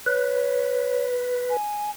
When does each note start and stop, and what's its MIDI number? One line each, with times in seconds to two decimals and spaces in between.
0.06 1.57 71
0.06 1.05 73
1.50 1.91 80